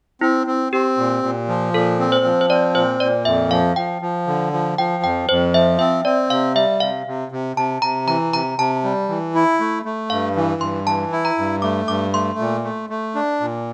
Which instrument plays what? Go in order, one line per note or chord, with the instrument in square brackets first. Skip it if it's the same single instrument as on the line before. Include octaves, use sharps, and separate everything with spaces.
[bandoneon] C4 [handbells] E4
[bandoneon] C4
[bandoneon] C4 [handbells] G4
[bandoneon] A#2
A#2
F3
[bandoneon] A#2 [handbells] A4
[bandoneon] C4
[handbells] C5
[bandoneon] F3
[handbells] C5
[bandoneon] C4 [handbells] D5
[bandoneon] A#2 [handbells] C5
[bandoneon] A#2 [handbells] D5
[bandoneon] F2 [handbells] E5
[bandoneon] F3 [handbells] F5
[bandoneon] F3 [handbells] G5
[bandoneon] F3
D3
F3
[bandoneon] F3 [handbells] G5
[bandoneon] F2 [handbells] G5
[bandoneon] F2 [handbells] C5
[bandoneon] F3 [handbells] E5
[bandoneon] C4 [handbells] E5
[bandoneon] C4 [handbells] D5
[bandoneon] C3 [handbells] F5
[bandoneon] G3 [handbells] E5
[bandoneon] C3 [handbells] F5
[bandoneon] C3
C3
[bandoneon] C3 [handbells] A5
[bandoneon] C3 [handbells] A#5
[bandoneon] E3 [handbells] A#5
[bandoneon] C3 [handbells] A#5
[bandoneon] C3 [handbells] A5
[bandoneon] G3
E3
E4
A3
A3
[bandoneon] G2 [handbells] F5
[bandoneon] E3
[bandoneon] G2 [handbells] C6
[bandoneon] E3 [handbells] A5
[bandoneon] E4
[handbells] A#5
[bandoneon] G2
[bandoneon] A3 [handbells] D6
[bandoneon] G2 [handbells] D6
[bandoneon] A3 [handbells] C6
[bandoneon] A#2
A3
A3
D4
A#2